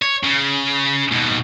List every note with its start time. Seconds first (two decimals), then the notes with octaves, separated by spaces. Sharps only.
0.02 C#5
0.24 C#3
1.11 D#2 B2